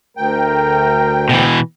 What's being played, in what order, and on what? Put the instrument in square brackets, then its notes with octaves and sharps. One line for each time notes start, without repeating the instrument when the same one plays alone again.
[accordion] D2 G5 [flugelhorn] A#4
[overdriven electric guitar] B2 E3